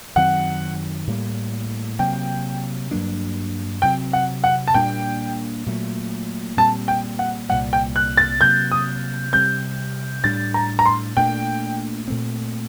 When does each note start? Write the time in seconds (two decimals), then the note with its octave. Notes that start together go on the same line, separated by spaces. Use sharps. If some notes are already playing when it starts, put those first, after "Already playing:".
0.16 F#2 D#3 F#3 C4 F#5
1.07 A2 G3 A#3
1.99 C3 F#3 A#3 G5
2.91 G2 F#3 A#3 D4
3.82 C3 F#3 C4 G5
4.13 F#5
4.44 F#5
4.68 A5
4.74 A#2 G3 A#3 D4 G5
5.66 A#2 F#3 A3
6.57 A#2 G3 C4 A5
6.88 G5
7.19 F#5
7.49 C2 A#2 G3 F#5
7.73 G5
7.96 F#6
8.17 A6
8.41 C3 F#3 A#3 G6
8.72 D#6
9.33 C3 G3 C4 G6
10.24 A2 G3 D4 A6
10.54 A#5
10.79 A#5
10.86 C6
11.17 A#2 A3 D4 G5
12.08 A#2 A3 C4